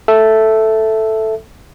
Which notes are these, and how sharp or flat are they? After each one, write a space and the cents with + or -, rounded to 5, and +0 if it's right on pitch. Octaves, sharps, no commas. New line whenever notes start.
A4 +0 E5 +0